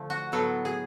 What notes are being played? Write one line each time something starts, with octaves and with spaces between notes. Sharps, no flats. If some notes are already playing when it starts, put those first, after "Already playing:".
Already playing: D3 F3 A3
F#4
A2 F#3 B3 A4
G#4